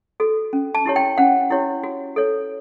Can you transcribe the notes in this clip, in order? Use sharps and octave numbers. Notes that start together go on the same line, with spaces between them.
F#4 A4
C#4
A5
E4 G4 C#5
G5
C#4 F#5
E4 G4 C#5
F#4
A4 C#5